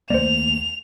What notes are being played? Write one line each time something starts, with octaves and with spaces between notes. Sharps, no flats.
D#2 A3 A#3 C5 D5 F7